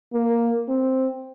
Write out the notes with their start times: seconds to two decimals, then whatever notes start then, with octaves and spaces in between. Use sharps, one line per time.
0.13 A#3
0.69 C4